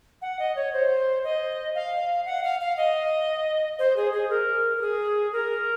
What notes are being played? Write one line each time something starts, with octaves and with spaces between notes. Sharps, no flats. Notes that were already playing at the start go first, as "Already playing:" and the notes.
F#5
D#5
C#5
C5
D#5
F5
F#5
F5
F5
D#5
C5
G#4
G#4
A#4
A#4
G#4
A#4